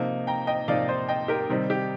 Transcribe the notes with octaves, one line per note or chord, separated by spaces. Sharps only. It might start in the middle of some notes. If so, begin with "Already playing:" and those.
Already playing: C3 F3 A#3 D#4
G5 A#5
D#5 G5
C3 F3 A#3 D#4 D5 F5
C5 D#5
D#5 G5
G4 A#4
C3 D#3 G3 C4 D#4
G4